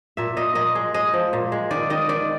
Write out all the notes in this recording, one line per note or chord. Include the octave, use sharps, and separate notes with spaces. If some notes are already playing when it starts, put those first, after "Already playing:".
A#2 E5
A#2 D#5
A#2 D#5
G#3
G#3 D#5
F3
A#2
G#3
D#3 D5
D#3 D#5
D#3 D5